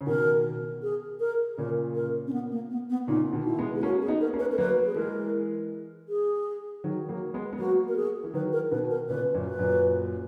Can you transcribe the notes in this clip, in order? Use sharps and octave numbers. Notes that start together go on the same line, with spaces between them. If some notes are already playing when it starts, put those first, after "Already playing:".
C#3
B2 D#3 A#4
G#4
A#4
A#2 C#3 A#4
A#4
C#4
B3
A#3
B3
B3
A#2 C#3 D#4
B2 D#3
E4
G#3 B3
G#4
A#3 C#4 F#4
G#4
B3 D#4
A#4
A#3 C#4
B4
A#4
F#3 A#3 B4
G#4
E3 G#3 A#4
G#4
D#3 F#3
F#3 A#3
G#3 B3
B3
F#3 A#3 F#4
A#4
G#4
E3
D#3 F#3 B4
A#4
B2 D#3 B4
A#4
A#2 C#3 B4
F#2 A#2
B4
F#2 A#2